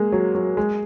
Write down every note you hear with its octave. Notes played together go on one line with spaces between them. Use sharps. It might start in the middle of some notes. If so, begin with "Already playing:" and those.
Already playing: G#3 A#3
F#3
F#3
G#3